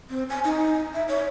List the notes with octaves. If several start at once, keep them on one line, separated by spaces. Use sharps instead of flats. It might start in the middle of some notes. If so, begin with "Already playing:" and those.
C4
G#5
D#4
E5
C#5